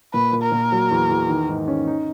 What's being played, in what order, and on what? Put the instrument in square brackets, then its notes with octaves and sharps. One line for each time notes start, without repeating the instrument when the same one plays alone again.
[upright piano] A#2 [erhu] B4
[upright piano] A#2
[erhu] A#4
[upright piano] A#2
F#3
E2
E2
D#3
G#2
C#4
D#4